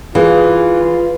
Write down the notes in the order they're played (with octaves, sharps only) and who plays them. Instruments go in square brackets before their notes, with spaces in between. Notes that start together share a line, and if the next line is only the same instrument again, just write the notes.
[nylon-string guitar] E3 [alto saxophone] F4 [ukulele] G#4 F5